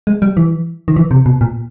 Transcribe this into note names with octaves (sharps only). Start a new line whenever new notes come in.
G#3
G3
E3
D#3
E3
C3
B2
A#2